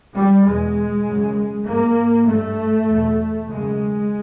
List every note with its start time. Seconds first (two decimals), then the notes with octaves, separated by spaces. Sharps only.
0.16 G3
0.46 E2 B2 G#3
1.06 F#2 C#3
1.66 G#2 A#3
2.27 G2 A3
2.87 E2 B2
3.48 F#2 C#3 G#3